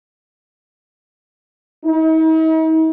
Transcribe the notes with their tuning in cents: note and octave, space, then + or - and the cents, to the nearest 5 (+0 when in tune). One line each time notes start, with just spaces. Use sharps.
D#4 +45